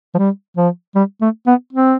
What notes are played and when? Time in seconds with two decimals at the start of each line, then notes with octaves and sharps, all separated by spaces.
0.15 F3
0.18 G3
0.57 F3
0.95 G3
1.21 A3
1.47 B3
1.73 C4